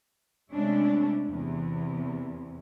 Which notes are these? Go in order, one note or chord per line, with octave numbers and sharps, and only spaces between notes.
C3 G#3 A3 C#4 D4 E4
E2 C3